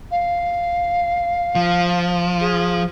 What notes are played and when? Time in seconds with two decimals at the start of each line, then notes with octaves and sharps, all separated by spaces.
0.11 F5
1.55 F3
2.40 G#4